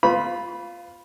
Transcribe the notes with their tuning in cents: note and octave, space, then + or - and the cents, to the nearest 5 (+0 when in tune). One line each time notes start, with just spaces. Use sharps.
F4 +0 B4 +35 B5 -10